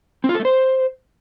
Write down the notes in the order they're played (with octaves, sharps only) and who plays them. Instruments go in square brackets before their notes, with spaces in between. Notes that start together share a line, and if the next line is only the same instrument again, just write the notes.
[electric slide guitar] C4
F4
A4
A3
C5